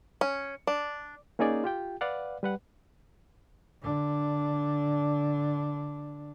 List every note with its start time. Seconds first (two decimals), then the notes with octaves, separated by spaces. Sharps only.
0.21 C#4
0.67 D4
1.39 A#3 C#4 D#4 G#4 D5
1.64 F4 G4 G5
2.01 B4 D5 F5 F#5
2.43 G3 B4 F#5
3.82 D3 D4